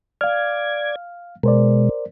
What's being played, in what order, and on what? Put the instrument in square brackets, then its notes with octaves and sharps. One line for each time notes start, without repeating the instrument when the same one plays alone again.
[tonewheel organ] D5 G#6 [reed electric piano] F5 F6
[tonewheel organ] B2 G#3 [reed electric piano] A#4 C5 D5